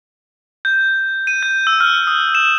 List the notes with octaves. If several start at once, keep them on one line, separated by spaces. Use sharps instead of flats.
G6
D#7
G6
E6
F6
D#6
E7